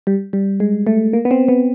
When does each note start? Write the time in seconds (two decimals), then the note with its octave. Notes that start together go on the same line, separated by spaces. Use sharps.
0.07 G3
0.33 G3
0.60 G#3
0.87 A3
1.13 A#3
1.25 B3
1.31 C4
1.48 B3